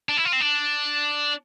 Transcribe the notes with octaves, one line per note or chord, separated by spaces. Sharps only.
D4
E4
F4
C4
D4